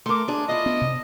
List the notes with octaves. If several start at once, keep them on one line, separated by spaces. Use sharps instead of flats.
A3 A#4 C6 D6
D4 G#4
E4 F4 D#5
B3
C3